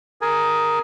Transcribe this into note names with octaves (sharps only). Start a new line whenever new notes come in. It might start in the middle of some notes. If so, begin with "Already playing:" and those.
G#4 A#4 G#5